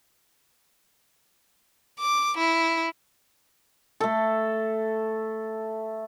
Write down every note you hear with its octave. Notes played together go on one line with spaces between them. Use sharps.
D6
E4
A3 A4